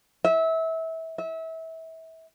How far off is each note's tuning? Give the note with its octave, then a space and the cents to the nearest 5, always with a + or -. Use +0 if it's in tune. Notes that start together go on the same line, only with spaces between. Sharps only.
E5 -25
E5 -30